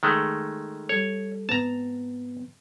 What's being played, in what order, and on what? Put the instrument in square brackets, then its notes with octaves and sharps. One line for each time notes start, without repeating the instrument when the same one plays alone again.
[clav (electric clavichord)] D#3 G#3 A3
[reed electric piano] G3 A4 [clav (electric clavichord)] C#5
[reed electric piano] G#2 B3 C4 [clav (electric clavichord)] A5 A#5